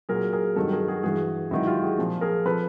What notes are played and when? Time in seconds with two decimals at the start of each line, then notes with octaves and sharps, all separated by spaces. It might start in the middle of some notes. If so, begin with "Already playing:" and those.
0.09 A#2 F#3 G#4 A#4
0.33 G#4 A#4
0.56 G2 D#3 F#3 G4 A4
0.72 G#4 A#4
0.88 F#4 G#4
1.03 G2 E3 F#4 G#4
1.51 G#2 D#3 F#3 E4 F#4
1.67 F4 G4
1.82 F#4 G#4
1.98 A#2 F3
2.21 G#4 A#4
2.45 F3 A4 B4